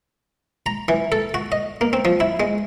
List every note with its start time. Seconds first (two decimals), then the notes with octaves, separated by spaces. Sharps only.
0.66 A#5
0.88 E3
1.12 A4
1.34 F#4
1.52 D#5
1.81 A#3
1.93 C4
2.05 F3
2.20 E4
2.40 G#3